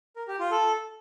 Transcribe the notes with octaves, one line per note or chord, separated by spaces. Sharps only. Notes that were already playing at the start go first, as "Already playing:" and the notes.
A#4
G4
F4
A4